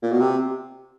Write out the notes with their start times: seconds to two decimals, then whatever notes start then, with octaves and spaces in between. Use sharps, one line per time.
0.03 A#2
0.12 B2
0.20 C3